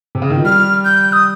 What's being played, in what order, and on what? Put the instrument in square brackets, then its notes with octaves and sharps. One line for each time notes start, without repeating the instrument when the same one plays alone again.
[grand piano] C3
C#3
D#3
F3
[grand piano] G3 [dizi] F6
[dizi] G6
D#6